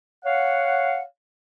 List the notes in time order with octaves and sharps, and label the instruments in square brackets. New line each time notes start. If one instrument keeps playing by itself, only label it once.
[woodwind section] C#5 F5 F#5